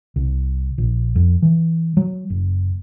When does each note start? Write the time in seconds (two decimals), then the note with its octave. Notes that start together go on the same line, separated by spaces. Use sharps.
0.16 C2
0.78 A#1
1.15 F2
1.42 E3
1.97 F#3
2.30 F#1